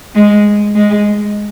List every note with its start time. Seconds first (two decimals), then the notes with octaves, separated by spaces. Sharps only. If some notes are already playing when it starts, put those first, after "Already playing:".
0.15 G#3
0.76 G#3